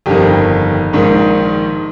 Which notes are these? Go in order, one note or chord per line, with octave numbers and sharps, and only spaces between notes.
G1 F2 D#3 G4
A#1 G#2 D#3